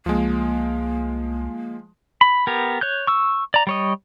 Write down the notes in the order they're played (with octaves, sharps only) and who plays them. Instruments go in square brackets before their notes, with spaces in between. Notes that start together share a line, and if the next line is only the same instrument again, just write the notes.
[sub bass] C2 [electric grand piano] F3 G#3 [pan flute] A#3
[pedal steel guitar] B5
B3 G4 A#4
C#5 F#6 G6
C#6 E6
D5 A#5
G3 C#5 D#5